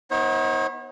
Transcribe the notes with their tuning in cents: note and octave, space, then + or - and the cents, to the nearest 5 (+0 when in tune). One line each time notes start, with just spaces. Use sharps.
B3 +0 D#4 +35 C#5 -40